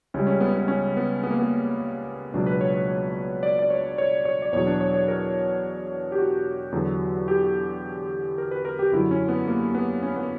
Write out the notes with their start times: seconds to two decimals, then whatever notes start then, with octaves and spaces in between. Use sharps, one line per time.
0.14 C#2 C#3 G3 C#4
0.27 C#4
0.40 B3
0.54 B3
0.68 C#4
0.97 B3
1.24 B3
1.31 A#3
1.39 B3
2.34 C#2 B2 F#3 D4
2.46 B4
2.61 C#5
2.74 C#5
2.88 C#5
3.43 D5
3.59 D5
3.70 C#5
3.98 C#5
4.25 C#5
4.42 D5
4.52 E2 B2 F#3 C#5
4.67 D4
4.81 C#5
4.94 C#5
5.08 A#4
6.12 G4
6.18 F#4
6.72 E2 D3 F#3
7.28 G4
8.38 A#4
8.51 B4
8.65 A#4
8.79 G4
8.92 F#2 D3 F#3 E4
9.11 C#4
9.29 B3
9.47 A#3
9.75 B3
10.03 C#4
10.16 B3